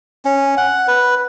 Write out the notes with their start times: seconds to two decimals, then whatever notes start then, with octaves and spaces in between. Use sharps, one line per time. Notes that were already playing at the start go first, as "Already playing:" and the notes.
0.25 C#4
0.57 F#5
0.87 B4